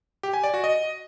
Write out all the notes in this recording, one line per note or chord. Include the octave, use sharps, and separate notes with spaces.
G4
G#5
D5
F#4
D#5